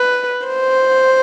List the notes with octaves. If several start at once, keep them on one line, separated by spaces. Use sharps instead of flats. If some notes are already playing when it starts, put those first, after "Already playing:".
Already playing: B4
C5